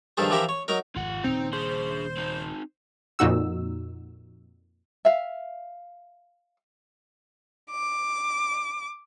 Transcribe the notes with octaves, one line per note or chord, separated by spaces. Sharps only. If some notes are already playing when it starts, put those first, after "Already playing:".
G2 D#3 F3 G#4 A4 C5
E3 F3 G4 A#4 C5 E5
C#5
F#3 D#4 A#4
G#1 F2 F4 F#5
D#1 A#2 C#3 C4 D#4
D4 G#4 C5
C4 D#4
F2 A#2 D#4 F#4 E6
E5 F5
D6